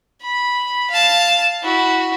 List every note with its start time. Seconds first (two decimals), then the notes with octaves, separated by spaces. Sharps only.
0.22 B5
0.90 F5 A5
1.63 E4 F#4